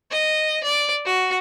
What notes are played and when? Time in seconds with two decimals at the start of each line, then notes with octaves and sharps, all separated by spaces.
0.11 D#5
0.63 D5
1.05 F#4